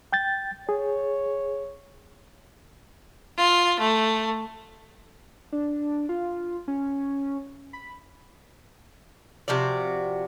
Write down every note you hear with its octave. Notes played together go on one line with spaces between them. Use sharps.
G5 G6 A6
G#4 C#5
F4
A3
D4
F4
C#4
B5
C3 F3 F#4 D5